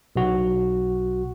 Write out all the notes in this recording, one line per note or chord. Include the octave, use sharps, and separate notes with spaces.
B1 F#4